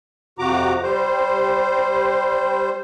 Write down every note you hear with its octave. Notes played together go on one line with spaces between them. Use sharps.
F2 C3 F3 F#4 A#5 D6
G3 C5